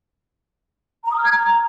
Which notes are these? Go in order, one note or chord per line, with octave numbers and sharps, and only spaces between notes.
A#5
D#6
F6
G#6
A#5